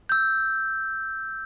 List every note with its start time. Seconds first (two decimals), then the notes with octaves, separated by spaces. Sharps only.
0.09 E6 G6